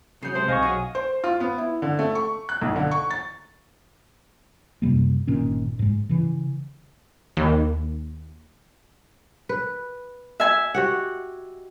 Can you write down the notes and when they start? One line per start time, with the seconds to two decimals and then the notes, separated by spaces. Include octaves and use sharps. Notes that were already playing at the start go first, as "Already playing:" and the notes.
0.23 C#3 F#3 D#6 G6 C7
0.35 C3 G#3 A3 C5
0.48 B1 D#5 F5 G#5 C#6 A#6
0.63 F#3 F#4 G#4
0.95 C5
1.24 F4
1.40 B3
1.58 E4
1.82 D3
1.99 A3
2.15 C#6
2.49 F#6
2.61 B1
2.76 D3
2.91 C#6
3.11 A6
4.82 F#2 C3 G3 A#3
5.27 G1 A#2 D#3 C#4
5.79 G#2 G#3
6.09 C#3 E3
7.37 D#2
9.49 B4
10.40 E5 G#5
10.74 F#4 G4 F#5